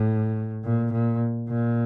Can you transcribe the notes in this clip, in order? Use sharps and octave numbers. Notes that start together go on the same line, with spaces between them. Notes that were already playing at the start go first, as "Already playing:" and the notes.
Already playing: A2
A#2
A#2
A#2